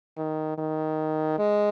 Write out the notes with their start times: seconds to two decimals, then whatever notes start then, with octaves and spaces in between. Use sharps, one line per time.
0.17 D#3
0.58 D#3
1.39 G#3